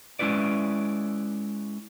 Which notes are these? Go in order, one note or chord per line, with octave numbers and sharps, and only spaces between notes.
G#3 C#4 E4 B4 D5